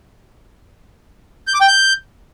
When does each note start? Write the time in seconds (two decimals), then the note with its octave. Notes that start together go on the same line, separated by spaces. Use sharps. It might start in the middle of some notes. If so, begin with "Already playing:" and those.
1.47 G6
1.54 D6
1.61 G5
1.67 G6